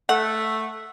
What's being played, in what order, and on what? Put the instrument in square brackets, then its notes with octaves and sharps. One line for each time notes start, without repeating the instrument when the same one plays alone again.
[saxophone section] A3 [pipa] F#5